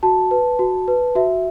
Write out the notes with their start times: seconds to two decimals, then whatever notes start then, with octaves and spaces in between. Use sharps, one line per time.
0.03 F#4 A5
0.31 B4
0.59 F#4
0.88 B4
1.15 F#4 E5